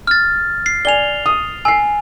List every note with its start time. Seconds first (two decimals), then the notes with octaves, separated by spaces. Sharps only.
0.07 F6 A6
0.66 C7
0.85 D5 G#5 F7 G7
1.26 D#6
1.65 G#5 E6 C7